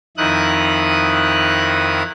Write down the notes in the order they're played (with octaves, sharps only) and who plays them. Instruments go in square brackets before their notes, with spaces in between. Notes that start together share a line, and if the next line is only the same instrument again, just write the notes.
[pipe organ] F2 D#3 D#4 E4 D#6 F#6